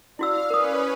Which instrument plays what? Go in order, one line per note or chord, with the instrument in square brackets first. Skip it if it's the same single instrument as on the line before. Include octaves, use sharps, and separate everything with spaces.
[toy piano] E4 F#4 E6 [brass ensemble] D5 [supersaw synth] F5
[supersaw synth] C#4 B4 [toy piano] A#4 D#6